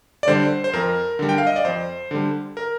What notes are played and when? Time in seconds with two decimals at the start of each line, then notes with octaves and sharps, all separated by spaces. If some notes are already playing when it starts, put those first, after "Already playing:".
0.23 D5
0.28 D3 G3 C5
0.64 C5
0.73 F2 A#4
1.19 D3 G3
1.29 G5
1.38 F5
1.47 D#5
1.56 D5
1.65 F2 C5
2.11 D3 G3
2.57 A#4